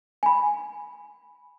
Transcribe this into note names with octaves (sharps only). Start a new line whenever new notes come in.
G#5 B5